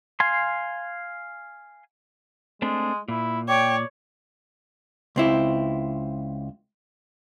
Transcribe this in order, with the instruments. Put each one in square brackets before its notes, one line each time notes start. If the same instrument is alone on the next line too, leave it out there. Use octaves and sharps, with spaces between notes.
[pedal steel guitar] F5 G#5 C6
[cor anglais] G#3 [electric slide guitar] A3 C4 D4
[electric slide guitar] A#2 [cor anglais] E4
[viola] C#5 [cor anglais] D5 [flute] G5
[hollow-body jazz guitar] C#2 C4 E4